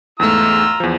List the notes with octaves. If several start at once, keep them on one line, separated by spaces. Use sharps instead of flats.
E2 G#2 A3 F4 A#5 E6
E2 F3